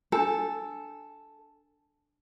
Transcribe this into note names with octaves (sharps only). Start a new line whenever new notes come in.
D4 A4 G#5